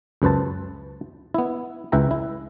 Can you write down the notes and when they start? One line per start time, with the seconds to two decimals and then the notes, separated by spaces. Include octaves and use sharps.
0.22 C#2 F#2 B4 C5 A5
1.34 B3 E4
1.92 C#2 E4 B4 E5 G5 A#5
2.11 E4